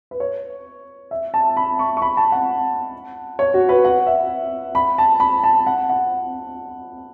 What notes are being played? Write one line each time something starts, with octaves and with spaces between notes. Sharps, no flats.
B4
C#5
E5
A5
B5
C#6
C#6
B5
A5
F#5
C#5
F#4
B4
F#5
E5
B5
A5
B5
A5
F#5
F#5